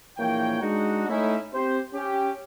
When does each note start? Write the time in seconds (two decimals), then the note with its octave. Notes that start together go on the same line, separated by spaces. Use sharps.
0.18 A#1 E3 A#3 C#5 G5
0.62 G#3 D4 D#4 F#4
1.09 A3 C#4 D#4 E4
1.53 C4 G4 C5
1.94 C#4 G4